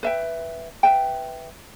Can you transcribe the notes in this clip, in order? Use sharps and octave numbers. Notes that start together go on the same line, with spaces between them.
B4 E5 G5
B4 E5 G5